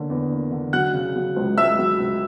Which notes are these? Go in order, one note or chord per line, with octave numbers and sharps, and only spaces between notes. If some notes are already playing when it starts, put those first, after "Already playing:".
Already playing: D3 A#3 C#4
E2
A#3
D3
F#3 F#5 F#6
C#3
F#3
C#2
C#2 E5 E6
F#3
C#2